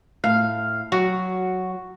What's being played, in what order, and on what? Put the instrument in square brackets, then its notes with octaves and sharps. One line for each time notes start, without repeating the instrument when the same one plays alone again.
[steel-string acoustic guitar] A2 [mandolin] F5
[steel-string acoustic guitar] F#3 [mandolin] F#4